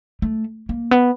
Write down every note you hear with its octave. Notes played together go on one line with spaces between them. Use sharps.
A3
A#3
B3